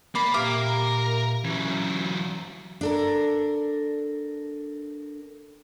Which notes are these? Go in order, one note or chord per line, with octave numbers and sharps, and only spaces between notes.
A#3 D5 B5
A#2 G4 E5 F5 D6
A#4
E3 F#3 C#4
D4 A4 A#4